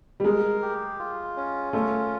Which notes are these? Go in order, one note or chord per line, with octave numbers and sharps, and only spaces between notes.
G3
G#3 A#4
G4
F4
C#4
A3 F4